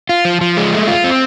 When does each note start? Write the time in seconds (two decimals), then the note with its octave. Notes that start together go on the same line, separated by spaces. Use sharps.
0.09 F4
0.25 F3
0.41 F3
0.57 G#3
0.73 A3
0.88 F4
1.04 C4